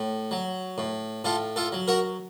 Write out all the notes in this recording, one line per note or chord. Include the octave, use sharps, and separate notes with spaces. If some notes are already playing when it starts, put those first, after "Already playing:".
Already playing: A2
F#3
A2
A2 F4 A4
F4 A4
F#3
F#4 A#4